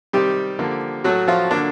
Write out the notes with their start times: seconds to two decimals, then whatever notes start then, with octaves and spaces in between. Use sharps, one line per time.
0.13 C3 D#3 G3 C4 G4
0.59 D3 F3 A#3
1.04 A2 F#3 A3 F#4
1.28 F3 F4
1.51 D3 F#3 A#3 D4